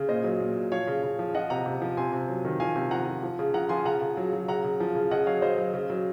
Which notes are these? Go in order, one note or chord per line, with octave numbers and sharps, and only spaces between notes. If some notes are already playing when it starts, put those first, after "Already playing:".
Already playing: C#3
A#2 C5 D#5
F#3
A#2
A#2
F3 C#5 F5
C#3
C#3
F3
F3 D#5 F#5
C3 F#5 A#5
C3
F3
C3 G#5 C6
C3
F#3
D#3
F3 F5 G#5
C3
F3 F#5 A#5
F3
F3
C#3
F3 F#5 A#5
F3 G#5 C6
C#3 F#5 A#5
C#3
F#3
F#3
C#3 F#5 A#5
C#3
F3
C#3
C#3 D#5 F#5
F#3 C#5 F5
F#3 C5 D#5
F#3
C#3
F#3